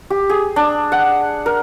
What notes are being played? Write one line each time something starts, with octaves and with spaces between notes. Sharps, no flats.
G4
G#4
D4
F#5
A#4